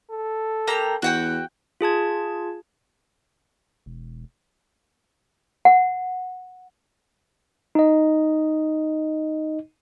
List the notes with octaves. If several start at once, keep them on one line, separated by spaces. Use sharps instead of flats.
A4
A#3 G4 A#5
E2 F#4 F#5 G5
F4 G#4 A5 G#6
E1
F#5
D#4 D#5